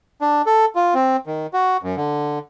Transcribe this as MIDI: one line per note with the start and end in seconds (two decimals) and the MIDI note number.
0.21 0.42 62
0.46 0.65 69
0.75 0.94 65
0.94 1.17 60
1.27 1.47 51
1.53 1.77 66
1.83 1.96 42
1.97 2.39 50